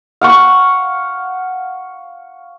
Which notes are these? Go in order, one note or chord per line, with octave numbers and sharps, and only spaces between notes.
F5 F#5 C#6